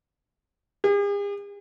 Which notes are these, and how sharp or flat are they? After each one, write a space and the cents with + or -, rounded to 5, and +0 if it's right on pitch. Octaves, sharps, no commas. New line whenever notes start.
G#4 -45